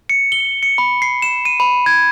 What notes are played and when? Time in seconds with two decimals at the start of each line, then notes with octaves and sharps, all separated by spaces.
0.09 C#7
0.32 G7
0.63 C#7
0.78 B5
1.02 C7
1.22 E7
1.45 D#7
1.60 B5
1.86 G#6